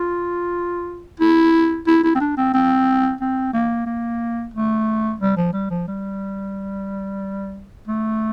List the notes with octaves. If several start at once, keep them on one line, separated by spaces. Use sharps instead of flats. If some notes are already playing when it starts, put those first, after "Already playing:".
Already playing: F4
E4
E4
E4
C4
D4
C4
C4
C4
A#3
A#3
A3
G3
F3
G3
F3
G3
A3